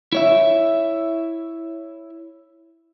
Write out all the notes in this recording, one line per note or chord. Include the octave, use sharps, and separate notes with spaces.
E4 C#5 E5